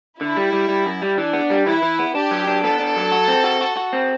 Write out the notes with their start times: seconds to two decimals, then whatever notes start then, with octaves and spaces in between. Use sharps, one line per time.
0.20 D3 E4
0.36 G3
0.53 G3
0.69 G3
0.85 F#2
1.02 G3
1.18 E3 D4
1.33 B3
1.50 G3
1.66 E3 E4
1.82 E3
1.99 B3
2.15 D4 G4
2.31 F#3
2.47 D4
2.63 B3 A4
2.79 D4
2.96 F#3
3.12 F#4
3.28 C4
3.44 F#4
3.61 F#4
3.77 F#4
3.93 C4